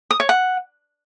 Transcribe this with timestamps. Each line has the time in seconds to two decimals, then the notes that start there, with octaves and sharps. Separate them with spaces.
0.11 D#6
0.20 C#5
0.29 F#5